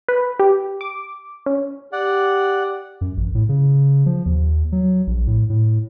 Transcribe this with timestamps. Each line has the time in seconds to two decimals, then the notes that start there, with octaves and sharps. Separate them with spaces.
0.08 B4
0.40 G4
0.81 D6
1.46 C#4
1.93 G4 D5 F#5
3.01 F#2
3.17 A1
3.35 A2
3.49 C#3
4.06 F3
4.26 D#2
4.72 F#3
5.07 A#1
5.27 A2
5.50 A2